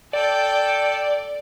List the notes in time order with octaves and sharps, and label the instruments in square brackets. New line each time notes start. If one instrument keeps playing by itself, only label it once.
[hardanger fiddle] A4 G5 [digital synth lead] D5